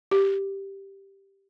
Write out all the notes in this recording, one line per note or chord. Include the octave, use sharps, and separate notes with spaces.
G4